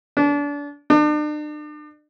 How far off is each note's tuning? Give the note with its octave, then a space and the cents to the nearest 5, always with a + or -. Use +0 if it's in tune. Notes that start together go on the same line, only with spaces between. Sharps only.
D4 -30
D4 +40